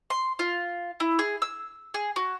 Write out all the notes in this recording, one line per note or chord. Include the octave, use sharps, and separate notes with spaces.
C6
F4
E4
G#4
E6
G#4
F#4